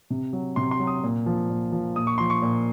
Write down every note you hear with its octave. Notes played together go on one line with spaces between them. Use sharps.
C3
F#3
C3 C6
C6
F#3
D#6
A#2
F3
A#2
F3
A#2 D#6
C#6
F3 C6
C#6
A#2